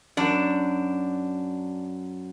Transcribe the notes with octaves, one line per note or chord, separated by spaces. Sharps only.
F#2 D4